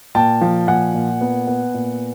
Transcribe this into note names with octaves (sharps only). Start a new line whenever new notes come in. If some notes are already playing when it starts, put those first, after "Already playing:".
A#2 G5 A5
F3
A#2 F#5 G#5
A#2
B3
B3
A#2